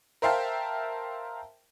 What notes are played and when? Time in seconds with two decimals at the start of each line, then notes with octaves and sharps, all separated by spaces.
0.22 A#4 C5 E5 F5 G5 A5